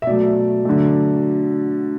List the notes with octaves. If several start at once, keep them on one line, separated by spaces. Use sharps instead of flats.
E5
B2 F#3 A3 D5
D3 F#3 A3